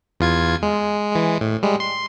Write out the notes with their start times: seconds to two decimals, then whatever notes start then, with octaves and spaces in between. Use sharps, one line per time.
0.20 E2 F4 G#6
0.63 G#3
1.12 E3 G#3
1.41 A2
1.63 G3 G#3
1.80 C6